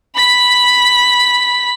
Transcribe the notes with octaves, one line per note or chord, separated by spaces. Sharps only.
B5 B6